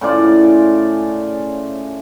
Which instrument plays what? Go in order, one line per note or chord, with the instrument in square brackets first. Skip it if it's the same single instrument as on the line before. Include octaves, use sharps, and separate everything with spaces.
[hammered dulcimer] A2 C#3 F4 D5